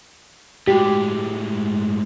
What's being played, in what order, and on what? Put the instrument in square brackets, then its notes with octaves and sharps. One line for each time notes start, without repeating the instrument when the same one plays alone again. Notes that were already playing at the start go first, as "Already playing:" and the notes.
[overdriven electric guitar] A2 G#3 [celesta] F#4 G5 B6 [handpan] G4